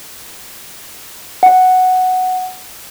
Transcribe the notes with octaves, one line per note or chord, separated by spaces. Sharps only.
F#5